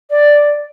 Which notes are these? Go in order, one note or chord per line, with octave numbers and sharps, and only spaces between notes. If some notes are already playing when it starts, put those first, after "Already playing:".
D5